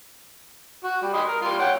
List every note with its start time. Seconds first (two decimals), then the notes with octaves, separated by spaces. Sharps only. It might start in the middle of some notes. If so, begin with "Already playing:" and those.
0.84 F#4
1.02 G3
1.13 D#5 B5 C6
1.28 A#4
1.42 G3 F4 C6
1.59 C#5 F#5 G5